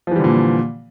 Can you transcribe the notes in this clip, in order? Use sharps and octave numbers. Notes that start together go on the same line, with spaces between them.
A#2 D3 E3 F3 G3